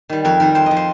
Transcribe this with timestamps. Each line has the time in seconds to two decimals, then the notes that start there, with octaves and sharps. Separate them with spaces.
0.09 D#3 G3
0.25 F2 A#4
0.40 D#3 G3 A#4
0.55 F2 C5
0.66 F3 D#5
0.77 C5